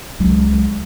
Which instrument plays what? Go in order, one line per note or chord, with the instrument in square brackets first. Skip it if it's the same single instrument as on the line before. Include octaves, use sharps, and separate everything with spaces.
[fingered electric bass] C#2 F#3 G#3